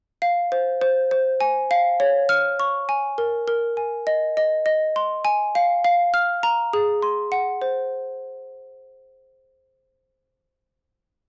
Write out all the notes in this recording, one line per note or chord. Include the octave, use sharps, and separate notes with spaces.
F5
C5
C5
C5
G#5
F5
C#5
F6
C#6
G#5
A#4
A#4
G#5
D#5
D#5
D#5
C6
G#5
F5
F5
F6
A#5
G#4
C6
F#5
C5